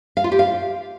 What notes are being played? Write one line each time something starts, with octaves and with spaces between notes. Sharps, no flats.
F5
F4
G4
F5